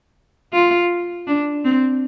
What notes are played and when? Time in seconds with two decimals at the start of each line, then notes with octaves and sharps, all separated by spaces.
0.53 F4
1.27 D4
1.65 C4